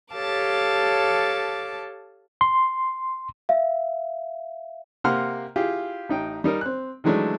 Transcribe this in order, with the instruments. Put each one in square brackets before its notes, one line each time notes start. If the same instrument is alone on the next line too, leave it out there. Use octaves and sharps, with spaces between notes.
[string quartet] G4 A4 C#5 F5 A5 D6
[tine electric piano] C6
[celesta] E5 F5
[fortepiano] C3 A#3 F#5 C6 F6
E4 F4 G4 G#4
A1 D#4 G5
G3 D#4 A#4
C4 F#6
D#3 E3 F#3 G#3 A3 D4